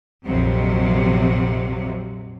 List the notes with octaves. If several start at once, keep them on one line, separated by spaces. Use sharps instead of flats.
A#1 F2 C3 F#3